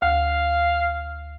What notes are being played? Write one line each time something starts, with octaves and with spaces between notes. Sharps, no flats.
D2 F5